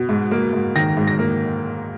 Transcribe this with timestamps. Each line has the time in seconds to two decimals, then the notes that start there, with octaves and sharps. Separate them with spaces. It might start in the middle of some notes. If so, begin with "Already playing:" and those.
Already playing: B2
0.09 G#2
0.31 A#3
0.53 G#2
0.75 D#3 A#6
0.97 G#2
1.07 A#6
1.19 A#3